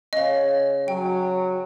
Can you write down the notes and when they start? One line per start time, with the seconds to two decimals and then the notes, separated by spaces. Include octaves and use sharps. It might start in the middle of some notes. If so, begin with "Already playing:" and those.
0.13 C#3 C#4 D#5 F5
0.88 F#3 G5